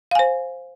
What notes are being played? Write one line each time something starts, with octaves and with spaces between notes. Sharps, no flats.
C5 F5 G#5